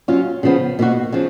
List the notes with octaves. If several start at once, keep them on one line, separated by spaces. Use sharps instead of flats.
F#3 C#4 F4
C#3 F3 B3
B2 A#3 D#4 F#4
C#3 F3